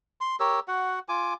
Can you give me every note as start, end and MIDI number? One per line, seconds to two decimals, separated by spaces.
0.21 0.36 84
0.40 0.60 67
0.40 0.60 70
0.40 0.60 73
0.40 0.60 88
0.68 0.99 66
0.68 0.99 78
1.09 1.34 65
1.09 1.34 80
1.09 1.34 86